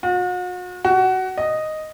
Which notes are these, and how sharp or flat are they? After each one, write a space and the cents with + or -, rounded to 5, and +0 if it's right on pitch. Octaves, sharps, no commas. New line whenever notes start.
F#4 -40
F#4 +20
D#5 -5